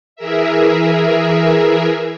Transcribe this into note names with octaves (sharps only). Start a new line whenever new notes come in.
E3 G#4 A#4 E5